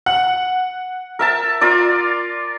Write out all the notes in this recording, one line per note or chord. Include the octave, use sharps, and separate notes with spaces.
F#5
A#4 E5 A5
F4 A#4 D5